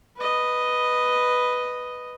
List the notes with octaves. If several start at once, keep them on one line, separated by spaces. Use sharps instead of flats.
B4 D#5